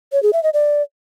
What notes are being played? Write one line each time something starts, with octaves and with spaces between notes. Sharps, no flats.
C#5
G#4
E5
D#5
D5